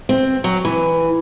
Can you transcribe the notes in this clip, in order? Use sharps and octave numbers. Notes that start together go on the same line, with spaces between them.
C4
F#3
E3